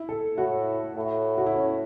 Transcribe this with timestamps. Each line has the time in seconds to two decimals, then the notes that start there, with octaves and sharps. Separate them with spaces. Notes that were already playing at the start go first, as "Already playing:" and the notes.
Already playing: E4
0.09 A4
0.37 A2 F#4
0.96 A2
1.38 F#4
1.46 E4
1.55 C#4